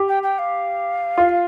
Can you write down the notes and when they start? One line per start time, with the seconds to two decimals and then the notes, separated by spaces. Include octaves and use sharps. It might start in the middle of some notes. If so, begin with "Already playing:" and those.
Already playing: G4
0.08 G5
0.23 G5
0.39 F5
1.18 F4